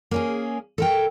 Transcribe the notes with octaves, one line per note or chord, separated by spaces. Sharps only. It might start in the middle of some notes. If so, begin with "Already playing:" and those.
A#3 C#4 G#4
A4 A#4 G5